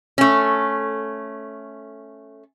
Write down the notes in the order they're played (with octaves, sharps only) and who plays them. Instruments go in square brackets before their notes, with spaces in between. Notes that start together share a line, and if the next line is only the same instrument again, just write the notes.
[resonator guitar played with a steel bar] A3 C#4